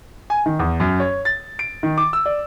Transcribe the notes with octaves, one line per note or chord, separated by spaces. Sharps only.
G#5
D#3
E2
F#2
C#5
A6
D7
D#3
D6
E6
D5